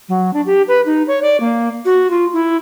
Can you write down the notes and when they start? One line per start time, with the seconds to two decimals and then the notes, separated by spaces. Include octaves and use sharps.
0.09 F#3
0.34 D4
0.46 G4
0.68 B4
0.86 D#4
1.08 C#5
1.22 D5
1.40 A#3
1.85 F#4
2.10 F4
2.33 E4